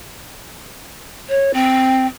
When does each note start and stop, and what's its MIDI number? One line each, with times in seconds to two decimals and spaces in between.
1.29 1.51 73
1.53 2.05 60